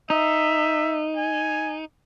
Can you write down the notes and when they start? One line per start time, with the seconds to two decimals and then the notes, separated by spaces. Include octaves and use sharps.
0.10 D#4 E5
1.17 G#5